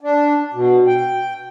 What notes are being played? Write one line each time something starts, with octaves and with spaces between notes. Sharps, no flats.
D4
B2
G5